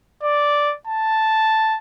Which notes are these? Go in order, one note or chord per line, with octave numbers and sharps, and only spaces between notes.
D5
A5